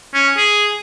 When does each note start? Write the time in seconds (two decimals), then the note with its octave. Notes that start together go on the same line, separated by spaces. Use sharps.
0.14 C#4
0.37 G#4